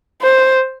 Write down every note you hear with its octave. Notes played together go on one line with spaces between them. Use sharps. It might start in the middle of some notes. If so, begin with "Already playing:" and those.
C5